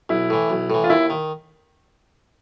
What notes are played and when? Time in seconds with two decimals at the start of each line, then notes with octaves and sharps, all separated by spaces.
0.09 B1 E4
0.30 A2 E3
0.50 B1
0.70 A2 E3
0.84 F4
0.90 D#2 E4
1.10 D#3